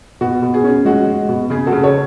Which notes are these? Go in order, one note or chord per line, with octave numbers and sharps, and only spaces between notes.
B2 F#4
B2
G#4
C#4
G#3 F#4
G#3
B2
C#3 G#4
F#4 A4
C#3
A4 C#5